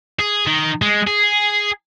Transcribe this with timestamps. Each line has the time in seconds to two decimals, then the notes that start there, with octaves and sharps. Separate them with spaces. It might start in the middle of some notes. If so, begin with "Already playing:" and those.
0.19 G#4
0.46 D#3
0.82 G#3
1.08 G#4